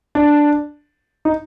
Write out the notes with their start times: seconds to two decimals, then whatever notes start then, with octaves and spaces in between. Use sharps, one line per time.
0.15 D4
1.25 D#4